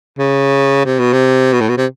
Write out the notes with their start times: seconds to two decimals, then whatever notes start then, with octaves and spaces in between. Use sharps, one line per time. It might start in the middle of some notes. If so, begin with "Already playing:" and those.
0.18 C#3
0.85 C3
0.99 B2
1.13 C3
1.52 B2
1.61 A2
1.69 B2
1.77 C3